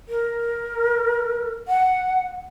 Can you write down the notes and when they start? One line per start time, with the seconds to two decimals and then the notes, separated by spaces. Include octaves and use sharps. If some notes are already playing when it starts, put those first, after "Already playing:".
0.09 A#4
1.68 F#5